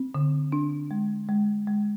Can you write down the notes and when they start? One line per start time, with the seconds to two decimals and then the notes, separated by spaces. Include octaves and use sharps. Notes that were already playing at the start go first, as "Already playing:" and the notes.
Already playing: C4
0.15 D3
0.52 D4
0.91 G#3
1.29 G#3
1.67 G#3